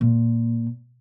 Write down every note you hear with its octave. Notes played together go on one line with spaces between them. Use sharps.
A#2